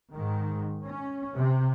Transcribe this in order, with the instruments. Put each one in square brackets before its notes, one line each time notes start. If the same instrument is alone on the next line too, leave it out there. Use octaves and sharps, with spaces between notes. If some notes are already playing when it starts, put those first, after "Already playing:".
[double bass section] G#2 D#3
C#4
C3